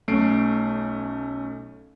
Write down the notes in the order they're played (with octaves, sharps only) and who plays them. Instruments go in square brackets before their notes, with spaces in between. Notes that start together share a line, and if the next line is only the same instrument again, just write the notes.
[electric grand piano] B1 A3 C#4 C7 D7